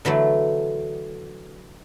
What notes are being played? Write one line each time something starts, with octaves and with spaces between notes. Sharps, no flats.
D3 E3 F#3 A3